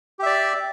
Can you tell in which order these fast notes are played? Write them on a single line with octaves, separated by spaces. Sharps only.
G4 E5 D5